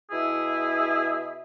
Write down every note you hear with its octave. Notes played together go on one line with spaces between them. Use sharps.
B2 E4 G#4 E5